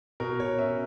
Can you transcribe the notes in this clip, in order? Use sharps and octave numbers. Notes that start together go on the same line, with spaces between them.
B2 A#4
B2 C#5
C#4 E5